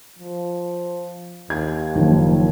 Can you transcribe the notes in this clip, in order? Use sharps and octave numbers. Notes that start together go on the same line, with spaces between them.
F3
D#2 G#6
F#1 D#3 F3